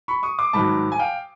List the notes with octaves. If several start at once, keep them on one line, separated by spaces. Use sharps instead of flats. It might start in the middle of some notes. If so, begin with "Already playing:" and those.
B5 C#6
C#6 D#6
C6 D6
G#2 D#3 F#3 A5 B5
G#5
F5 G5